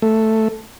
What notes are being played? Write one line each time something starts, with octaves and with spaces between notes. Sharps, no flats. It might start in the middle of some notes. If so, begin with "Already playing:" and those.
A3